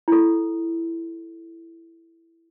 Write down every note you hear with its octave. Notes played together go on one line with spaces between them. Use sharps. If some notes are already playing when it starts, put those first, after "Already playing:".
E4 A4